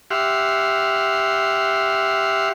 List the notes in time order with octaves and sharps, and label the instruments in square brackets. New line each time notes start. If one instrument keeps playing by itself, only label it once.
[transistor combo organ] G4 E5 F#5 C6 F6